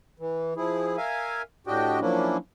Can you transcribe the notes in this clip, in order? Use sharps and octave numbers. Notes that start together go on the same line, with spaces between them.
E3
F3 E4 G#4
A#4 E5 F5 G#5
A2 D4 F#4 G4 D#5 G5
F3 F#3 A#3 C#4 D4 E4